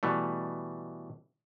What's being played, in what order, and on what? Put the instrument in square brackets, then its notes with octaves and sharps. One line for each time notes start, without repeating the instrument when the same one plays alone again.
[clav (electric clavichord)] B2 E3 G3 A3